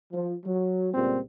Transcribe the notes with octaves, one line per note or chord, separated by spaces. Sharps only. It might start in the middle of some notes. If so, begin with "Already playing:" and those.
F3
F#3
C#2 A#2 G3 C4